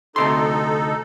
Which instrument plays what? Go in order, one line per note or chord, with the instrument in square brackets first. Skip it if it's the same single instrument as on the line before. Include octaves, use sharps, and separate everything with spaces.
[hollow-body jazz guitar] D2 C3 C6 [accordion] D#4 A4